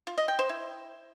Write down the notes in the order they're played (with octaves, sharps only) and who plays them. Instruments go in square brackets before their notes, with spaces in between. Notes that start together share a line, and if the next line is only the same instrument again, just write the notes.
[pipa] F4
D#5
G5
C5
E4